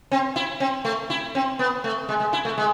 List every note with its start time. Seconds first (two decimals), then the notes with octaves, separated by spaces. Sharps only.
0.11 C4
0.36 E4
0.60 C4
0.85 A3
1.10 E4
1.35 C4
1.59 B3
1.84 A3
2.09 G#3
2.20 G#3
2.33 E4
2.45 A3
2.58 G#3